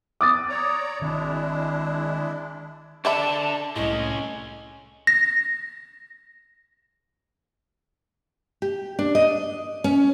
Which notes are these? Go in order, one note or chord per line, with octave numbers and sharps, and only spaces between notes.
D6 D#6 A6
C#5 D5 A#5
D#3 G#3 C4 D4 E4
D4 A4 D5 E5 A5 B5
C2 A2 G#3 A#3 C#4 D#5
A#6
G4
D4
D#5
C#4